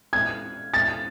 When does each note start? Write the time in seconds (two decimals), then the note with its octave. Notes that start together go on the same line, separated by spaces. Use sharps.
0.13 G#6
0.74 A6